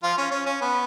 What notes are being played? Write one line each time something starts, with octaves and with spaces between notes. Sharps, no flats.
F3 F4
C#4
C#4
C#4
B3